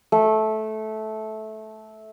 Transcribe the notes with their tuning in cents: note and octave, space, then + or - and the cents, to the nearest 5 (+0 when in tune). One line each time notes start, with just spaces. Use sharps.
A3 -15